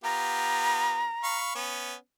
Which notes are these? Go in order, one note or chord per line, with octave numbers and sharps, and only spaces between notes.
B3 F4 G4 A#5
F5 B5 C#6
B3 C#4